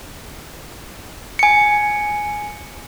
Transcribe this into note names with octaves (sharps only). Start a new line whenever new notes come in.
G#5 C#7